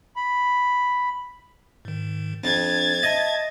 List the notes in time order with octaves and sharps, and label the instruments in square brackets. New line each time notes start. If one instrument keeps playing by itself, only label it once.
[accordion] B5
[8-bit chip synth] G#2 D#3
[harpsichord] F2 [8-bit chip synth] D4 [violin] G#6 A6
[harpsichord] D#5 [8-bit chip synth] E5 A5